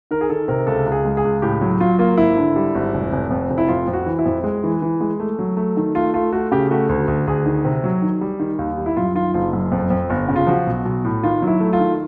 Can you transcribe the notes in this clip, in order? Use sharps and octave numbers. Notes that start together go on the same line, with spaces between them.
D#3 A#4
G#4
D#3 A4
C3 A#4
C#2 A4
C#2
G#4
G#3
G#4
C#2
A2 G4
F#3
F#3 F4
A#3 F4
G#1 E4
D3
G3
G#1
F1
F1
F2
F1
E4
F2 F4
F2
F#4
E3
E4
F2
G#3
E3
E3
G#3
A3
F#3
A3
D#3
A3 F4
A3 F4
A3 F#4
C#3 G4
A3 F#4
D2
D2
D2 G#4
D#3
C3
F#3
D#3
G3
D#3
D#2
G3
E4
F#2 F4
D#3 F4
F#1 F4
F#2
F2
F2
G1
C#3
F4
F3 F#4
B1
B1
A2
D#3 F4
F#3
E4
A3
F4
D#3